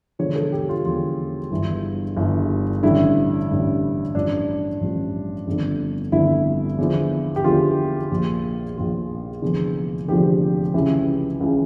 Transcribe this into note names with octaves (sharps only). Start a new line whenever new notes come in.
E1 E2 D3 F3 C#5
A4
G4
F4
E1 E2 D3 F3 F4
G1 G2 E3
G1 G2 E3
A1 G2 D3 E4
A1 G2 D3
A1 G2 F3 D4
A1 G2 F3
G1 F2 D3
G1 F2 D3 E4
E2 D3 F3
G4
E2 D3 F3 F4
A#1 A#2 F3
A#1 A#2 F3 F4
F1 E2 D3 F3
F1 E2 D3 F3 G4
C#2 C#3 E3
C#2 C#3 E3